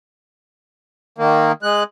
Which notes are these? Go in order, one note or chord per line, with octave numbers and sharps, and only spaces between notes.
D#3 A#3
G#3 F#6